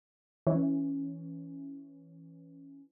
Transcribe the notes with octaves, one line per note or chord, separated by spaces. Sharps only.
E3 C#4